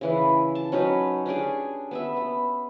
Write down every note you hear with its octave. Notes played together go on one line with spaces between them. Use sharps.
C#3 E3 B4
A5
F#3 C#4 D#4 B4
C#4 D4 G4 G#4
B3 B4 E5
B3